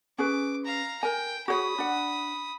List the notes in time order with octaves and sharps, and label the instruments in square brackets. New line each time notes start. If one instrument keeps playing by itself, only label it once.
[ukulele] C#4 G#4 B4 [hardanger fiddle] D6
[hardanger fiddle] F5 A#5
[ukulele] A#4 G#5 [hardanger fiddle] G5
[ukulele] F#4 G#4 C#5 [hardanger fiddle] B5 D#6
[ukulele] D4 F#5